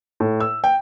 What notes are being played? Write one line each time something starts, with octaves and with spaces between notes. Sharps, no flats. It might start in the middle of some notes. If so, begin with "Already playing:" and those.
A2
E6
G5